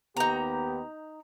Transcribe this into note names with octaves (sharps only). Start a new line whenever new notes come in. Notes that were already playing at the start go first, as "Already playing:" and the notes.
D#2 B3 D#4 G4 A#5